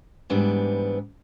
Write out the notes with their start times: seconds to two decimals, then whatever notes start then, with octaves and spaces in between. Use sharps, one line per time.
0.30 G#2 E3 G3 B3 D4